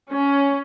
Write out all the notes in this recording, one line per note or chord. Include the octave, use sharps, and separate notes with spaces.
C#4